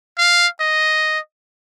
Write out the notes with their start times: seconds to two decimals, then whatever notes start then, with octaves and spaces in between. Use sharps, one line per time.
0.18 F5
0.60 D#5